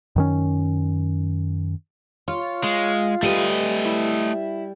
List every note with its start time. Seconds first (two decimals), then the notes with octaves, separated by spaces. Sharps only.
0.16 F#2 D#3 C#4
2.28 F4 C#5
2.64 G#3
3.23 G3 A3 B4 D#5
3.85 E4